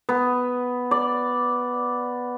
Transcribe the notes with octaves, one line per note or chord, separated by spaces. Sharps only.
B3
D5